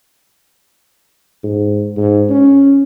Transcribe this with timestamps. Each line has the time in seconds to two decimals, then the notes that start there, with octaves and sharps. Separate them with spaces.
1.44 G#2
1.97 G#2
2.29 C#4